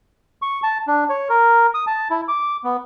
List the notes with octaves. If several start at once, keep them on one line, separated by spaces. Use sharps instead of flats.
C#6
A5
D4
C#5
A#4
D#6
A5
E4
D6
B3